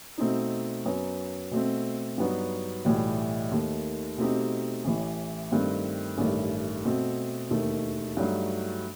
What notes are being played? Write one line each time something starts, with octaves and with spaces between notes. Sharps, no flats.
B2 A3 C4 D#4
F#2 F#3 B3
B2 A3 C4
G2 F#3 B3 D#4 F#4
B1 A2 E3 G3
D#2 D#3 A3
B2 A3 C4 D#4 G4
A1 A2 E3
G2 D#3 A3 C4
A1 G2 D#3 A3
B2 A3 C4
E1 D#2 D#3 A3
G2 F#3 A3 D#4 F#4